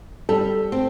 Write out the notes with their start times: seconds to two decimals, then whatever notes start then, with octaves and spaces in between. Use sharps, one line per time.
0.29 G3 A4
0.72 C4